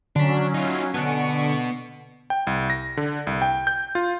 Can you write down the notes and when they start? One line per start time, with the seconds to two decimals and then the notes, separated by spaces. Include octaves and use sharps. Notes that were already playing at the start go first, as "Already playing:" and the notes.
0.16 D3 F#3 C#4 D4 B6
0.54 D#4 F4
0.94 B2 D3 B3 G#5 A5 C#6 F#6 D7
2.30 G5
2.47 C2
2.70 A#6
2.97 D3
3.27 C2
3.42 G5
3.67 G6
3.95 F4